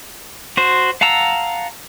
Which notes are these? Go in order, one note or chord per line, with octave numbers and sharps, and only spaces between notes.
F#4 C5
F5 F#5 A5 A#5 E6